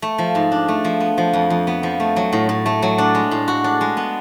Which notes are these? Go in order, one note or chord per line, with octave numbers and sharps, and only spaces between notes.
A3
F3
G#2
D4
A3
F3
B3
F3
F2
F2
B3
F3
A3
F#3
A2
A2
A3
F#3
D4
G#3
A2
F#4
D4
G#3
B3